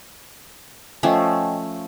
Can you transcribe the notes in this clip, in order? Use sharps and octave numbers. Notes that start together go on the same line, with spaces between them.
F3 A3 C#4 D#5 G5 G#5